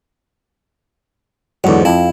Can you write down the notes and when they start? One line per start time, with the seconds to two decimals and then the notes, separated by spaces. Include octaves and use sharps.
1.64 E2 G#2 D3 F#3
1.85 F2 E4